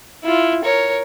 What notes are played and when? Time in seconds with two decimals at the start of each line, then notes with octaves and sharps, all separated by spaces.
0.24 E4 F4
0.64 A#4 C#5